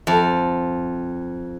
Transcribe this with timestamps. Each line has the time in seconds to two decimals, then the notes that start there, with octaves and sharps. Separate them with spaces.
0.07 F2